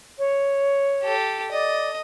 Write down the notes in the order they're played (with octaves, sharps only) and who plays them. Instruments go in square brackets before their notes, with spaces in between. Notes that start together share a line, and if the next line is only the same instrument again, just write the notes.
[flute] C#5
[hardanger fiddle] G4 A4
[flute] D5 [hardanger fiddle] D#5